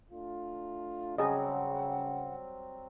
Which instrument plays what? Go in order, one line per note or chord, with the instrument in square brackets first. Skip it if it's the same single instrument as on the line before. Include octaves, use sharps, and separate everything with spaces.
[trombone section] A3 D4 F4
[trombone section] C#3 [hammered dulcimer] F#3 G3 C4 [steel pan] G#4 D#5 [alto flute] F#5